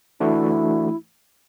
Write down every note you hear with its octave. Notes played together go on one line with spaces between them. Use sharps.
E3 A3 D4 E4 F#4